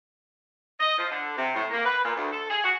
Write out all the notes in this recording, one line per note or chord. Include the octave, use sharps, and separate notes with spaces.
D#5
F3
D3
C3
A2
A#3
B4
A#2
D2
A4
G#4
F#4